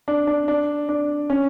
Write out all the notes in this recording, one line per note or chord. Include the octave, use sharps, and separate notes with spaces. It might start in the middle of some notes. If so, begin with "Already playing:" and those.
D4
D4
D4
D4
C#4